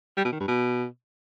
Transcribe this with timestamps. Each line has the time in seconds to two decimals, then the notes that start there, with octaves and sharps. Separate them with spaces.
0.17 G3
0.25 B2
0.32 D#3
0.40 G2
0.48 B2